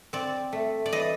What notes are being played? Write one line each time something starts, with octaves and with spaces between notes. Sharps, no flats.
C4 D5
A3
D5
E3 D#5